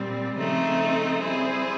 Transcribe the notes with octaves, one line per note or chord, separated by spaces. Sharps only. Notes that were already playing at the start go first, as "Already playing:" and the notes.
Already playing: A#2 G3 C4
C#3 F3 A3 C4 D#4
G3 C4 E4 G#4 C5